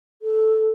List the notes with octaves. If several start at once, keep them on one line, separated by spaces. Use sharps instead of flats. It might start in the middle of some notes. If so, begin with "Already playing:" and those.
A4